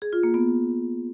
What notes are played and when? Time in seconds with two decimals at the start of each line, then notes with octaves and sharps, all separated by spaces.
0.02 G#4
0.13 F4
0.23 A#3
0.34 B3